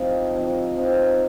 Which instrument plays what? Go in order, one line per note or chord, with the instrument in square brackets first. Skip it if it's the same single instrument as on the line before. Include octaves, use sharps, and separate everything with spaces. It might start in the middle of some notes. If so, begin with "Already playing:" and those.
Already playing: [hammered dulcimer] C3 F3 C4 D#4 F5
C3 F3 C4 D#4
C3 F3 C4 D#4 F5